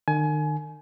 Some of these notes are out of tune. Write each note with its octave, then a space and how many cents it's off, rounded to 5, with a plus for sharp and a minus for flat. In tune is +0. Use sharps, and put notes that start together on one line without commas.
D#3 -40 G#5 +25